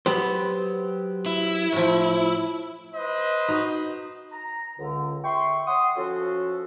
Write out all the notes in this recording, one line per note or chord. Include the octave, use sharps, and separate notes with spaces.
F#3 B3 G4 C5
E4
A2 F3
B4 C5 D#5
D#4 F#4
A#5
C#2 D3
E5 G5 C6 C#6
C#5 F#5 C6 D#6
F3 C#4 F#4 A4